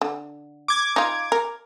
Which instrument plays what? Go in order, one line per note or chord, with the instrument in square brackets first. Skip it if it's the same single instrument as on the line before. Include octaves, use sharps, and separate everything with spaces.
[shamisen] D3
[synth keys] D6 G#6
[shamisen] D#4 F4
A#4